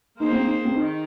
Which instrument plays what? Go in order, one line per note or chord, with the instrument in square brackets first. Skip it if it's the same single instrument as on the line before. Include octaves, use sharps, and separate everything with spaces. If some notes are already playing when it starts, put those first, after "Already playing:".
[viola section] A#3 G#4 C5 [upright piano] D#4
[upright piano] C4
D#4
C4
[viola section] D#3 [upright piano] D#4